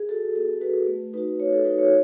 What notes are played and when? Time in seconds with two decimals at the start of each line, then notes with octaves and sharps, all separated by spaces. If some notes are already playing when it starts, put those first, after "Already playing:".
Already playing: G#4
0.09 F#4 A4
0.36 B3 A4
0.61 F#4 B4
0.88 A3
1.13 D#4 F#4 B4
1.39 A3 C#5
1.53 A4
1.65 D#4 F#4 B4
1.78 C#5